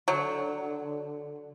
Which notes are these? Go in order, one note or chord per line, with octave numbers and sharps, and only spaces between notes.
D3 F#3